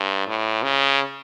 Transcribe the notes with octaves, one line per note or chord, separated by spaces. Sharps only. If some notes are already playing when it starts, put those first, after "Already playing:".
Already playing: G2
A2
C#3